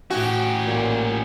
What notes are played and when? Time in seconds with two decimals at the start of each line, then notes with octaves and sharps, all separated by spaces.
0.11 A2 C#4 F#4 G4
0.67 A1 A#2